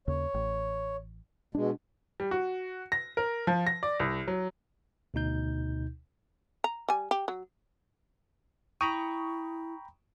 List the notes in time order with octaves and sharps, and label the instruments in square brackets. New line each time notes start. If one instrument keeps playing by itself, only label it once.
[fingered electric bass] D#2 C#3 [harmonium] C#5
[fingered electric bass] A1
[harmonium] B2 G#3 [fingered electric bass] D4
[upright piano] G3
F#4
A#6
A#4
F3
A#6
D5
C2
F#3
[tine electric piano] D2 B2 D#4 G6
[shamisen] A#5
G3 G#5
G4
F#3
[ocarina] E4 [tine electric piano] G5 A#5 B5 [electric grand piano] C#6 D#6 D#7